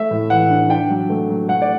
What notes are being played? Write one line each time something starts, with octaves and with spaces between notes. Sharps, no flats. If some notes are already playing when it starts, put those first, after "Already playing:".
Already playing: A3 E5
A2
E3 F#5
D4
D4 G5
F#3
A3
F#3
A3 F#5
D5